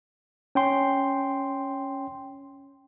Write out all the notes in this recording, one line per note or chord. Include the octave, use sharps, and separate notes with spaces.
C#4 G5 C6